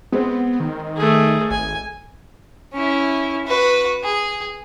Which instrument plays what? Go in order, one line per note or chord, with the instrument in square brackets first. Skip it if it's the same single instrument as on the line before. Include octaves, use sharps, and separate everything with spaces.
[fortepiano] G#3 C4 [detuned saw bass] B3
[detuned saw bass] D#3
[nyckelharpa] A3 G#4
[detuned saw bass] G#1 [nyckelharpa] G#5
[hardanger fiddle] C#4 E4
F#4 B4
G#4